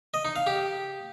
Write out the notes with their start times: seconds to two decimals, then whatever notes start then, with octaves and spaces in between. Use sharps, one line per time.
0.14 D#5
0.25 D#4
0.36 F5
0.47 G4